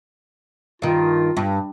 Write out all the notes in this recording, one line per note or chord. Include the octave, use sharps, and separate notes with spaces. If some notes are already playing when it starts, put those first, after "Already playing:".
G2 D#3 F4
G2